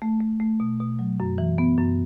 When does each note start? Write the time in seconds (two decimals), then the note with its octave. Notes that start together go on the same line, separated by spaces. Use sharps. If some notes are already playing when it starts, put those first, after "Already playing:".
0.02 A3
0.20 A3
0.40 A3
0.60 B2
0.80 B2
0.99 F#3
1.20 F#2
1.38 E3
1.58 B3
1.78 F#2